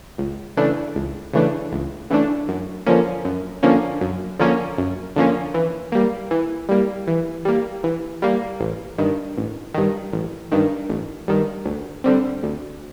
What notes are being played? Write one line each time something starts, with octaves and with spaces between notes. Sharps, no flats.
C#2
C#3 E3 A3 D4
C#2
C#3 E3 A3 D4
C#2
C#3 E3 A3 D4
F#2
D3 F3 A#3 C#4
F#2
D3 F3 A#3 C#4
F#2
D3 F3 A#3 C#4
F#2
D3 F3 A#3 C#4
E3
G3 A#3
E3
G3 A#3
E3
G3 A#3
E3
G3 A#3
A1
G2 D#3
A1
G2 D#3
A1
G2 D#3
A1
G2 D#3
D2
D3 G3 C4
D2